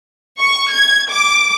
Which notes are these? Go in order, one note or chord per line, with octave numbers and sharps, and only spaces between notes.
C#6
G#6
D6